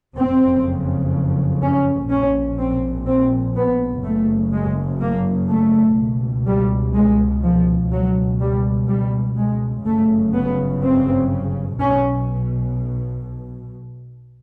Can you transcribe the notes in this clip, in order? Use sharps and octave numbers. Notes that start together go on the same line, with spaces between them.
F#1 F2 C#3 C4
C#4
A#1 A#2 C#4
C4
C4
B3
F#1 F#2 C#3 A3
G#3
A#3
A3
C#2 B2
G3
G#3
F3
C#2 B2 F#3
G3
G3
G#3
G1 F#2 C#3 A3
B3
C4
B1 B2 C#4